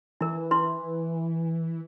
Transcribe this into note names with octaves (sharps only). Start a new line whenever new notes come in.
E3 E4 A#4
E4 B4 C6